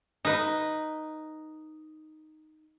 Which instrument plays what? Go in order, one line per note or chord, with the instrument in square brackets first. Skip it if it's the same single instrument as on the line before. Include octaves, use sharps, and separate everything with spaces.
[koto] D#4 B4